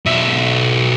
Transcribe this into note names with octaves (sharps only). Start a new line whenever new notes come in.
B1 E5